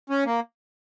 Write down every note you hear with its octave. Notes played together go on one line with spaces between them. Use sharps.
C#4
A#3